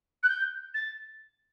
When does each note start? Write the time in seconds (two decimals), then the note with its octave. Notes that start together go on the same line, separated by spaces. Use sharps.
0.23 F#6
0.29 G6
0.74 A6